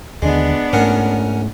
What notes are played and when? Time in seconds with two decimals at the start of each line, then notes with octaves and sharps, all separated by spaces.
0.22 D#2 D3 G#3 B3 D4
0.73 G#2 A3 C#4 A#4 F#5